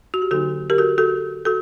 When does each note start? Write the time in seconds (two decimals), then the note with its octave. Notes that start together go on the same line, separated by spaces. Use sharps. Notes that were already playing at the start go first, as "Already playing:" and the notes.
0.14 F#4
0.22 G4
0.31 D3 F#3 A#3 D#4 F#4 A4
0.70 G4 A#4
0.78 F#4 A4
0.98 F#4 A4
1.45 F#4 A4